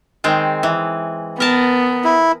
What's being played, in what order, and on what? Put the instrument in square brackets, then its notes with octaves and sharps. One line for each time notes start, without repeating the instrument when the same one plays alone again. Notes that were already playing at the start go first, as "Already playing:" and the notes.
[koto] D#3 G#3 C4
E3
[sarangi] B3 [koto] A#4 A5
[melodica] E4